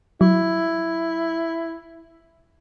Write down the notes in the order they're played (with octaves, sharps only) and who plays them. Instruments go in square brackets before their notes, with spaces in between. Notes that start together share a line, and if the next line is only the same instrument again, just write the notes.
[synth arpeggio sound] F#3 [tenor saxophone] E4